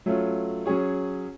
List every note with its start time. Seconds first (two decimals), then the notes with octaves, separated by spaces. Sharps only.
0.06 F#3 A3 C#4 F4
0.66 F#3 C#4 G#4 C#5